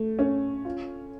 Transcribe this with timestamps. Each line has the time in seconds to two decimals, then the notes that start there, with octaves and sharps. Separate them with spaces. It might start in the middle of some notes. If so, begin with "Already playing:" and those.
Already playing: A3
0.19 C#4
0.65 F4